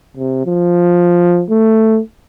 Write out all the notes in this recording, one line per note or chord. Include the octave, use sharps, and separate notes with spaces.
C3
F3
A3